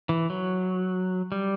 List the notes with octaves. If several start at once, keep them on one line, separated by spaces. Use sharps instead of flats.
E3
F#3
G3